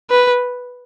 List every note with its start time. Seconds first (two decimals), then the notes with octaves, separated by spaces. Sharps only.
0.10 B4